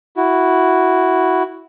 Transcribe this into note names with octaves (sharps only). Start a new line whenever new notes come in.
E4 F#4